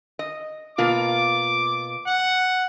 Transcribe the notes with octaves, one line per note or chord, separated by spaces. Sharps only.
D#5
B2 A#3 F4 D6
F#5